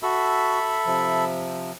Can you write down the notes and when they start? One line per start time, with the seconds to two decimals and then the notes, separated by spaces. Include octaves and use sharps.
0.03 F#4 A4 E5 B5
0.86 C3 F3